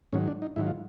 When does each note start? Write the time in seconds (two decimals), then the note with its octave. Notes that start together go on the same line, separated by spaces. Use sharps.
0.13 G#2 D#3 F#3 C#4
0.28 D4
0.42 D#4
0.56 G#2 D#3 F#3 E4
0.67 F4